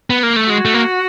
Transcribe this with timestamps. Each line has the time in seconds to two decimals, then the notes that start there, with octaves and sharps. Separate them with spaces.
0.10 B3
0.23 A#3
0.36 A3
0.50 G#3 F#4
0.65 A3
0.74 A#3